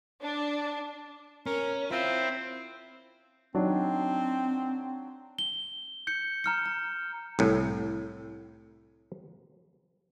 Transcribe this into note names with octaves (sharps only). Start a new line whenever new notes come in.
D4
C#4 A#4
C4 E4 F4
F#3 C4 D4 D#4
G7
G6 C#7
A#5 F6 C#7
A#5
C2 A2